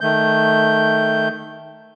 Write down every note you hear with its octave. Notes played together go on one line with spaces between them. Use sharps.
D#3 A3 G6